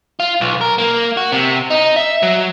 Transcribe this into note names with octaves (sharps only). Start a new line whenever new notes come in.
F4
B1
A#4
A#3
F#4
C3
D#4
E5
F#3